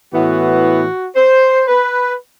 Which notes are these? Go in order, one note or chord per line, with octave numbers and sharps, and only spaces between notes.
A2 E3 B3 F#4
C5
B4